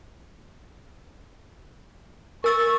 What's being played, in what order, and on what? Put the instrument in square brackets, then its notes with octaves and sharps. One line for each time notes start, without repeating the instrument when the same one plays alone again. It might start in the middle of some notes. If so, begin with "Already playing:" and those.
[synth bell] A#4 E6 A6 [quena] C#6